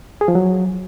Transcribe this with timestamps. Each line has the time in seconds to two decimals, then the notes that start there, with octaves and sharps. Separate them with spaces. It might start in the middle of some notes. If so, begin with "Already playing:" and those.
0.21 G#4
0.28 F3
0.35 F#3